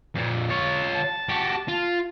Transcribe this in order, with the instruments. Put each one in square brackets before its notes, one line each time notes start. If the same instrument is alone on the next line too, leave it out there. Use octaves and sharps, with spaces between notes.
[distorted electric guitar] F2 A#2
F4 C#5
[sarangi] A5
[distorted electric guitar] F#4 G4
F4